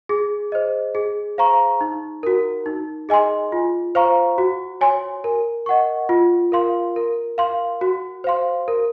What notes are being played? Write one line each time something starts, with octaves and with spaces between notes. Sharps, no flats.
G#4
C5 D#5
G#4
C5 F5 A#5 C#6
D#4
F#4 A#4
D#4
G#4 D#5 G#5 C6
F4
C5 F5 A#5 C#6
F#4
C#5 G#5 C6
A#4
D#5 F#5 C#6
F4
A#4 F5 C6
A#4
F5 C6
F#4
C5 F5 C6
A#4